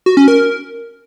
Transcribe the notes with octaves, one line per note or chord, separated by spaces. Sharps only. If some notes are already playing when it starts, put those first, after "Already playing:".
F#4
C#4
A#4